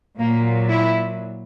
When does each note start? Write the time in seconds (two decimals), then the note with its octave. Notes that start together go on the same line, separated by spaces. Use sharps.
0.18 A#2 F#3 A#3
0.69 E4